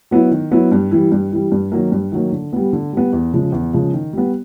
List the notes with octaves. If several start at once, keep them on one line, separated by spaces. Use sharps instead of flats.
F#3 B3 E4
D#3
F#3 B3 E4
G2
E3 G3
G2
E3 G3
G2
D#3 F#3 A#3
G2
D#3 F#3 A#3
D3
G3 B3
D3
G3 B3
E2
C#3 F3 G#3
E2
C#3 F3 G#3
D#3
G3 B3